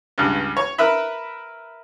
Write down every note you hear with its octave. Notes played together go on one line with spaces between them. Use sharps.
C#2 G2
C#5
A#4 B4 E5 B5